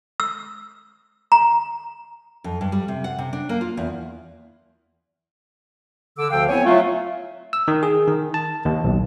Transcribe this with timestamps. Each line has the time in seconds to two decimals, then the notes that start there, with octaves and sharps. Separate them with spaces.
0.20 E6
1.32 A#5
2.44 F2
2.61 G2
2.72 G3
2.88 C3
3.04 F#5
3.19 C3
3.33 D4
3.49 A#3
3.61 F4
3.77 E2
6.18 D3 D6 E6
6.31 D2 D3 F3 F5 G5 E6
6.49 B3 C4 E4 C#5 G#5
6.66 F#3 A3 F4
7.53 E6
7.68 D#3
7.83 G#4
8.07 D#3
8.34 A5
8.65 D#2
8.84 B1